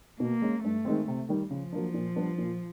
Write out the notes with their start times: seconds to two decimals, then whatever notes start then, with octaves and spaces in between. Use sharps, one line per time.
0.20 B2 A#3
0.42 G#3 C#4
0.64 G2 A3
0.85 D#3 G#3 C4
1.08 C3
1.29 D#3 G3
1.50 C#3 F3
1.73 F#3 A#3 D4
1.94 A#2
2.16 G3 B3 D4
2.38 A#2